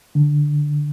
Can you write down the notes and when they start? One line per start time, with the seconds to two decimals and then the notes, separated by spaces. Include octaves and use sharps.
0.15 D3